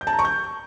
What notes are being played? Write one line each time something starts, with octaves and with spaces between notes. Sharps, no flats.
G6
A5
A#5
C#6
G6